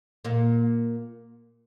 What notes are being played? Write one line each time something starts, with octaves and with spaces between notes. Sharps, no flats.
A#2 A#3